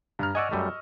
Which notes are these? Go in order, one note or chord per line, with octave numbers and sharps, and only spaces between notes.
G2 A#5 F6
D5 D#5 F#5 G#5 C#6 E6
F#2 G3 A3